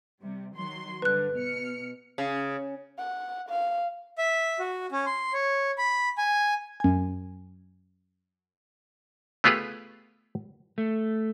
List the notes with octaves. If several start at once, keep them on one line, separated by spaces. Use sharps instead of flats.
C3 G3
D#3 F#3 C6
G2 D3 B4 F#6
B2 F6 C#7
C#3
F#5
F5
E5
F#4
C#4
C6
C#5
B5
G#5
F#2 G#5
A3 B3 F4 G4 G#4 B4
A3